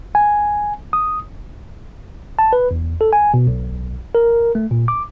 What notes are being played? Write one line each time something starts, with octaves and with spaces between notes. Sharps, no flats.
G#5
D#6
A5
B4
E2
A4
G#5
B2
B1
A#4
A3
A#2
D6